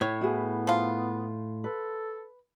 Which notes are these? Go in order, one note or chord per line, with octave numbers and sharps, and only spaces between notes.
A2 C#5
B3 E4 F#4 G#4
F3 F4
A4 B4